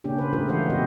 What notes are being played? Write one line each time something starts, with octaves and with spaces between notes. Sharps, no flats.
C#3 A#3 C#4 D4 G4
B4 C5
A3 F4 G4 G#4 A#4 B4
E3 G#3 C5 C#5 F5 F#5
B2 B3 F#4 G4 D#5